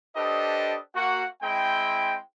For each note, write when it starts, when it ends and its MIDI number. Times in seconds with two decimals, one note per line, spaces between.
0.16 0.76 62
0.16 0.76 67
0.16 0.76 69
0.16 0.76 71
0.16 0.76 72
0.16 0.76 75
0.95 1.24 58
0.95 1.24 66
0.95 1.24 78
1.43 2.17 56
1.43 2.17 60
1.43 2.17 64
1.43 2.17 79